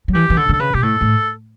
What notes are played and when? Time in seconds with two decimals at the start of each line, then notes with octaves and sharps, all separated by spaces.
0.08 F#3
0.14 E3 G4
0.30 E3
0.37 D3 A4
0.49 D3 A4
0.59 C#3 B4
0.74 B2 G4
0.82 A2 A4
1.01 A2